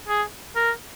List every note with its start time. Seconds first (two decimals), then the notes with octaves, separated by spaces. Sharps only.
0.08 G#4
0.56 A#4